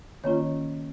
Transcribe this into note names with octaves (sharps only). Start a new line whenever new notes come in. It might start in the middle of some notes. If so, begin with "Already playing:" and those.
D#3 A#3 C#4 F4 C#5